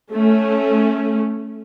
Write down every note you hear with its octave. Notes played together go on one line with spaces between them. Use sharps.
A3 C#4